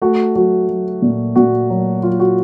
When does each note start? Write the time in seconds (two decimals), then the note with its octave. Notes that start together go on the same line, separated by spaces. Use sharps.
0.02 A3 F#4
0.35 F#3 F#4
0.69 F#3
1.02 A#2
1.36 A#2 F#4
1.70 F#3
2.03 F#3 F4
2.20 F#4